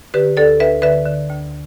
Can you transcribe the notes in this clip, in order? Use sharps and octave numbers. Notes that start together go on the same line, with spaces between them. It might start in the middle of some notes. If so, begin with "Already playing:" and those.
D3 G4 B4
D2 A4 D5
D2 B4 E5
D3 B4 E5
D3
D2